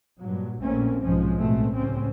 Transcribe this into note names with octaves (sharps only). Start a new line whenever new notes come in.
G2 A#2 F#3
A#1 A#2 A3 A#3 C4 C#4
B1 G#2 F3 G#3 C#4
A1 B2 G#3 A3 C4
C#2 A2 C3 C4 C#4